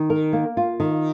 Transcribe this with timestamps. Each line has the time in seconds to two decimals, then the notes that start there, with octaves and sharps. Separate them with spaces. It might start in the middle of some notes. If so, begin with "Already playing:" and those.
Already playing: D#3
0.10 A#4
0.33 A#3
0.57 F4
0.80 D#3